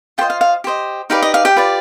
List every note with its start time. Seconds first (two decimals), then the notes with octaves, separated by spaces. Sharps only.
0.18 F4 G4 G5
0.21 C5 D#5
0.30 F5
0.41 F5
0.64 G4 C5 D#5
1.10 D#4 G4 B4 D5 F5
1.22 D#5
1.34 F5
1.45 G4 G5
1.56 F4 B4 D5